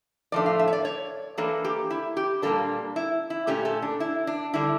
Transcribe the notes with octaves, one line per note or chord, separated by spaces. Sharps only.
A2 F3 A3 D4 D5
F5
E5
C#5
D5
C#5
E3 A#3 D4 A4
G4
E4
G4
A#2 G3 A#3 D4 A4
E4
E4
A#2 A3 C#4 G4
A4
D4
E4
D4
D3 G3 D4 E4